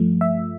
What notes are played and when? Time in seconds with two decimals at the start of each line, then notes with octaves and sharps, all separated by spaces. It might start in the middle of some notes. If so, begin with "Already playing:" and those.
Already playing: G2 F3 A3
0.21 E5